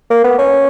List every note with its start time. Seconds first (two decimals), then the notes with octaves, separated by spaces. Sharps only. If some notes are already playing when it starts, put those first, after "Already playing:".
0.10 A#3
0.24 B3
0.39 C#4